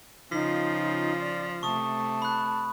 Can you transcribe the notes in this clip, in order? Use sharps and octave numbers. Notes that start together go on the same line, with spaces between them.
C#3 F3 D#4 F4 B6
D5
C3 A3 A5 C#6 D#6
B5 F#6